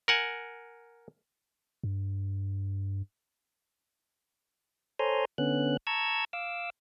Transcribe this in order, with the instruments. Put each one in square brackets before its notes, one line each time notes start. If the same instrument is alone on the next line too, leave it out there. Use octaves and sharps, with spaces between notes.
[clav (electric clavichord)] A#4 F#5 G#5
[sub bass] G2
[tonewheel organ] A4 C5 C#5 G#5 A#5 C6
D3 B3 C#4 F#6
A5 A#5 C#6 E6 G#6
F5 D6 E6